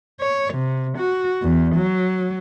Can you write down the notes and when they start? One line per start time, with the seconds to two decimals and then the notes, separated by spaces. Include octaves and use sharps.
0.20 C#5
0.54 C3
0.98 F#4
1.43 E2
1.76 F#3